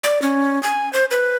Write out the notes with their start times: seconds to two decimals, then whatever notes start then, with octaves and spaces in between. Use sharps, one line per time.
0.04 D5
0.22 C#4
0.63 G#5
0.93 C5
1.11 B4